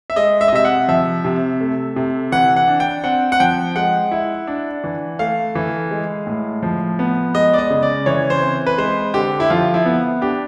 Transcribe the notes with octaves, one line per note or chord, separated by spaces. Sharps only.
E5
G#3 D#5
E5
D#5
C3 E5
F#5
F3 E5
C3
A3
C3
E3 F#5
F#5
D4
G5
C4 F#5
F#5
F3 G5
G#3 F#5
E4
D4
E3
A3 F5
E3
G#3
A2
F3
B3
G#3 D#5
D5
D#5
C#3
D5
E3 C#5
C5
C4
B4
G#3 C5
D3 G4
E4
F3 F4
E4
B3
D4 G4